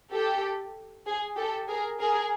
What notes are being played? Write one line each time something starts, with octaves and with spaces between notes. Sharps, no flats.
G4 A4
G#4
G4 A4
G#4 A#4
G#4 A#4